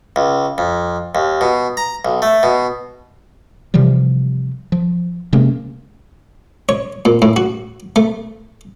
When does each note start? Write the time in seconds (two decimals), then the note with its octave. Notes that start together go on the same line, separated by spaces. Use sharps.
0.16 C#2
0.58 F2
1.15 D#2
1.41 B2
1.77 A#5
2.05 B1
2.22 A3
2.43 B2
3.74 C3 E3 F3 G3
4.72 F3
5.33 C3 G#3 A#3 C#4
6.69 C#5
7.05 A#2
7.22 A2
7.36 F#4
7.96 A3